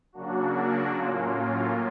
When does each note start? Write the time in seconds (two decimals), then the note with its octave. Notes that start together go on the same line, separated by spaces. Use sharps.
0.13 C#3 F#3 A#3 D4 F#4
0.94 A2 F#3 A#3 C#4 F4